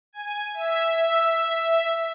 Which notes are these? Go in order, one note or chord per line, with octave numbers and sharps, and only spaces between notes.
G#5
E5